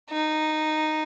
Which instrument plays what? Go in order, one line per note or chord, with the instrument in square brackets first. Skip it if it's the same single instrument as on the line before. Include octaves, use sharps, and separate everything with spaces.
[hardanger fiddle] D#4